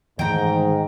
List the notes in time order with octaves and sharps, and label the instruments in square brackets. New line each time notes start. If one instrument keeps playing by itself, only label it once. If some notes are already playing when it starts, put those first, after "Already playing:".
[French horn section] G#2 [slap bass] D#3 E3 A3 [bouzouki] G5 A#5